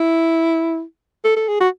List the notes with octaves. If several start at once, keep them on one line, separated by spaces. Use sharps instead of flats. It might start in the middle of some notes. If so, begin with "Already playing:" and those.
Already playing: E4
A4
A4
G#4
F#4